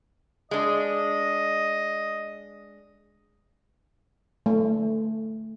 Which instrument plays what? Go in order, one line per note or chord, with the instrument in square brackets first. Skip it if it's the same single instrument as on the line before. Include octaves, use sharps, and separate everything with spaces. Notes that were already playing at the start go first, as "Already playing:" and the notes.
[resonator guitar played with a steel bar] G#3 D4 [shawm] D#5
[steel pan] A3